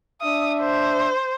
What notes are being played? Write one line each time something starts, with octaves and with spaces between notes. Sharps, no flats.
D4 E5 D#6
C5